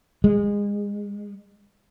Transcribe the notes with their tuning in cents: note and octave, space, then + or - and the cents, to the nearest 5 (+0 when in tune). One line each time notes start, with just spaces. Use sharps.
G#3 -25